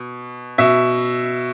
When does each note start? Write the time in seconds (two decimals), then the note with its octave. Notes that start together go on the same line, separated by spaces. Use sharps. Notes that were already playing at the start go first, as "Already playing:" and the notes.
Already playing: B2
0.58 B2 E5